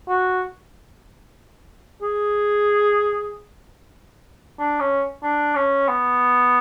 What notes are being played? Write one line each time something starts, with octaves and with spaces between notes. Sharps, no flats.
F#4
G#4
D4
C#4
D4
C#4
B3